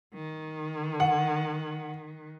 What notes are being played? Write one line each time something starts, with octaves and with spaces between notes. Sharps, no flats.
D#3
F#5